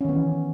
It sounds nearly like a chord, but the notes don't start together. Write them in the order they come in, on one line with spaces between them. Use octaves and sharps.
C#4 D#3 B3 E3